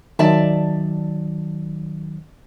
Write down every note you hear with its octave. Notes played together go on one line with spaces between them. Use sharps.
D#3 F#3 D5 E5 A5